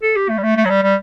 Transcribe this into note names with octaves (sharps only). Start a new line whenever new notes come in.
A4
G4
A3
G3
A3
A3
F#3
G3
G3